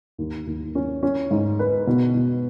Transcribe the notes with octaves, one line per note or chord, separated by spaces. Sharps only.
D#2
D#2
C#4
C#4
G#2
B4
B2
B2